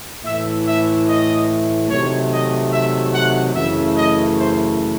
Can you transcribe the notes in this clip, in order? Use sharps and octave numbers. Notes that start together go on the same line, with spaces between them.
A2 E3 A3 E5
E5
D#5
C3 D#3 F#3 A3 C#5
D#5
E5
F#5
F#2 C#3 E3 A3 E5
D#5
C5